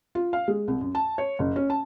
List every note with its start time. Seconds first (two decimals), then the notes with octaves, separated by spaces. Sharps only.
0.15 F4
0.33 F5
0.48 G#3
0.68 C2
0.81 F#2
0.95 A5
1.18 C#5
1.39 F#1
1.56 C#4
1.70 A5